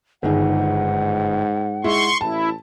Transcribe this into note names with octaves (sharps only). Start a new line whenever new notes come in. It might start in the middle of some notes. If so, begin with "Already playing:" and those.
G1 G#2 D#3 G#4 F#5
G#3 E4 C6 C#6
A1 E4 A5